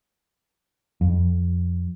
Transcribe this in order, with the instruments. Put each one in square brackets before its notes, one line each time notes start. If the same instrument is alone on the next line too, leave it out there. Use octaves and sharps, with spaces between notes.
[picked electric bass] F2